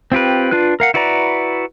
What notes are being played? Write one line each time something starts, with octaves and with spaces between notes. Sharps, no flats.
C4 F4 G4 B4
D4 F4 B4 F#6
A#4 F5 F#5
E4 F#4 B4 D5 A#5